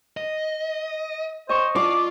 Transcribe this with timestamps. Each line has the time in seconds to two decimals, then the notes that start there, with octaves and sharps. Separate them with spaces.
0.17 D#5
1.49 C5 D#5 C#6
1.76 F4 D5 D6